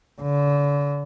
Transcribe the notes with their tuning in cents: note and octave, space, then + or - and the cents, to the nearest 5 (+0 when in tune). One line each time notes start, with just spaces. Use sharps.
D3 -35